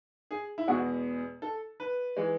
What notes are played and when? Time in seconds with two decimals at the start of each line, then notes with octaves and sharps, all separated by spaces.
0.31 G#4
0.58 E4
0.68 E2 B2 G#3 F#4
1.42 A4
1.80 B4
2.17 E3 G#3